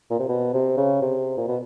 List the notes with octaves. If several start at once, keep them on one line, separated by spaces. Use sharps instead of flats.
A#2
C3
B2
C3
C#3
C3
A#2
B2